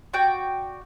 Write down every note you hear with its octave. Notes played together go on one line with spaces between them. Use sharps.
F#4 D5 G5